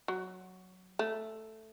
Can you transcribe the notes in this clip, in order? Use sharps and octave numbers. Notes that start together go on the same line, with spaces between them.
F#3
A3